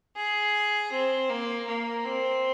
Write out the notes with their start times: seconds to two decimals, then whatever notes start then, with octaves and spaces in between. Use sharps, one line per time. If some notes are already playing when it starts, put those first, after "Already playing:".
0.17 G#4
0.92 C4
1.30 A#3
1.67 A#3
2.05 C4